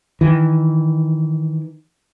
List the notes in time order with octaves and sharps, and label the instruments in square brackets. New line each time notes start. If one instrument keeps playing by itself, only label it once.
[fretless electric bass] D#3 E3